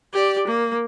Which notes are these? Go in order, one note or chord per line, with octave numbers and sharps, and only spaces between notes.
G4 D5
A#3